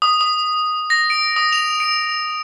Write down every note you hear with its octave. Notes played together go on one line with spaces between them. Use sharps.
D#6
D#6
A#6
D7
D#6
F7
D7